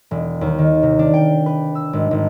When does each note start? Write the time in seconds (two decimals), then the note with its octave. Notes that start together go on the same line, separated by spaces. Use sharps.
0.11 E1
0.41 D#2
0.59 D#3
0.83 C3
0.99 D4
1.14 G5
1.46 B4
1.75 E6
1.93 G#1
2.11 G#1